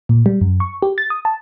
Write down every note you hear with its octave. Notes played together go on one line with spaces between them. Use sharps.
A#2
G3
F#2
C#6
G4
A6
D#6
A5